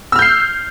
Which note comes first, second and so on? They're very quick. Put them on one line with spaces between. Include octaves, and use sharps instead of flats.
E6 F6 G6 C7